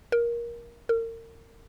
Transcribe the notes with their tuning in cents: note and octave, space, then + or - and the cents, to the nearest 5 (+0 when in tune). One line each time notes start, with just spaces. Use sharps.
A#4 +15
A#4 -35